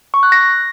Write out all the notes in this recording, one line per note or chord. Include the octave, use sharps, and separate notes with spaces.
C#6
F#6
A#6